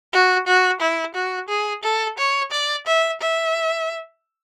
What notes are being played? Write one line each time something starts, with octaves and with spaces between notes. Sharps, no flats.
F#4
F#4
E4
F#4
G#4
A4
C#5
D5
E5
E5